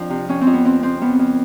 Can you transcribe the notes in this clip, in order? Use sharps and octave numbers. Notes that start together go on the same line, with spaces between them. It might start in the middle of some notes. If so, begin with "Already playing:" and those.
Already playing: F2 F3 D4
C3
F2 C#4
C4
F2
B3
F3 C4
C#3 C4
F2 B3
F2